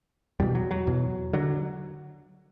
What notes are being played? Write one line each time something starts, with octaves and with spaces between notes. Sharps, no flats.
E2 B2 G3
F#3
F#3
E2 B2
D3 F#3